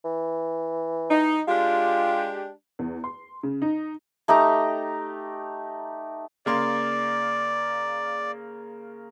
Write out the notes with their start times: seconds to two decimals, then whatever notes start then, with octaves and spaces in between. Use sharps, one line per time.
0.05 E3
1.10 D#4
1.48 G#3 D4 F4 G4
2.79 E2
3.04 C6
3.43 C#3
3.62 D#4
4.28 A3 D#4 G4 A#5
6.46 C#3 A#3 D5 C6